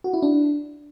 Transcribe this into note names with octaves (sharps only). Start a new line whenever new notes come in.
F#4
E4
D4